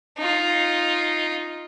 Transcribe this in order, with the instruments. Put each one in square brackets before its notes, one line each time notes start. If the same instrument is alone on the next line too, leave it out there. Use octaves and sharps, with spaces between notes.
[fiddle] D#4 F4